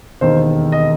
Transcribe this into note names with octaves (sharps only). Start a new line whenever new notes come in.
E1 D#2 D#3 C5
D#5